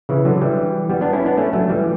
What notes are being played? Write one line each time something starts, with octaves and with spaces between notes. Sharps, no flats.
C#3 E3
D3 F#3
E3 G3
G3 B3
B3 D4
C#4 E4
B3 D4
A3 C#4
F#3 A3
E3 G3